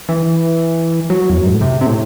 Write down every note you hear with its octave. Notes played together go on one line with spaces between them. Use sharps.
E3
F#3
E2
F#2
G#2
A2
C3
C3
A2